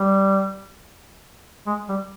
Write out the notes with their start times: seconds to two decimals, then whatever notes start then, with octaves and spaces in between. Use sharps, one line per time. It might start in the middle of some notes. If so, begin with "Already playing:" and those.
Already playing: G3
1.66 G#3
1.89 G3